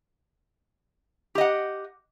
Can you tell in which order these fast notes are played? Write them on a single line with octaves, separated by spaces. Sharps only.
G4 D#5 F#5